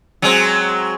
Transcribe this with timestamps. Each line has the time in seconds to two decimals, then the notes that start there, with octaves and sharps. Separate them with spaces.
0.22 F#3 G#3 C4